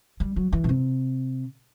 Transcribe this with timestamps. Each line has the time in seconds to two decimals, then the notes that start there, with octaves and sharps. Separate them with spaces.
0.20 G3
0.36 F#3
0.53 E3
0.64 B2
0.69 C3